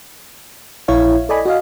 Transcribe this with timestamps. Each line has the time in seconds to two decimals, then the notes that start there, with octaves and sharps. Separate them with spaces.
0.88 A#1 E4 C#5 F5
1.29 A4 D5 D#5 G#5 B5
1.46 F#4 D#5 F5